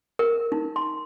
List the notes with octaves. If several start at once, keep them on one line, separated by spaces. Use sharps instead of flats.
A#4
D#4
C6